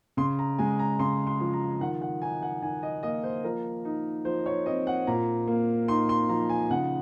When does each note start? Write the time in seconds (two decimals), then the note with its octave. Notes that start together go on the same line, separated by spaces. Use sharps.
0.17 C#3 C6
0.39 A#5
0.58 G#3 G#5
0.79 A#5
1.00 C#3 C6
1.27 C6
1.40 F3
1.53 A#5
1.81 D#3 F#5
2.02 F#5
2.22 D#4 G#5
2.42 F#5
2.62 D#3 G#5
2.83 D#5
3.03 A#3 D#5
3.24 C5
3.44 F3 A#4
3.85 D#4
4.25 F3 C5
4.46 C#5
4.66 C4 D#5
4.87 F#5
5.07 A#2 A#5
5.48 A#3
5.88 D#4 C6
6.09 C6
6.29 F3 A#5
6.49 G#5
6.70 C#3 F#5